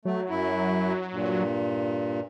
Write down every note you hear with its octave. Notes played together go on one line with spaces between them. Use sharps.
F#3 A3
F#2 E4
G2 A#2